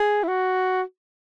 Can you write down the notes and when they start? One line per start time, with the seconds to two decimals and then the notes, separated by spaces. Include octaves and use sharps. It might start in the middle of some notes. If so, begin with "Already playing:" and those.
Already playing: G#4
0.24 E4
0.28 F#4